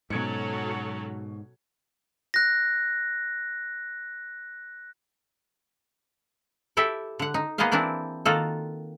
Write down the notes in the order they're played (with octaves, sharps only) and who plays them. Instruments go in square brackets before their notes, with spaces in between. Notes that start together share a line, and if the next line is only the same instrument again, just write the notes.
[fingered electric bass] G#2 [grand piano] B2 G#6 C#7 [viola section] F#3 C#4 A4
[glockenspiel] F#6 A#6
[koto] E4 G4 A4 E5
D3 F#5
D#4
A#3 B3 G#4 C5 D#5 F5
E3 A#3 C4 D4 E4
D#3 A#3 F4 F#4 A4